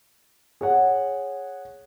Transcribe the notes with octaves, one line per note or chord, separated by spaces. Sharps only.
G#4 C#5 F#5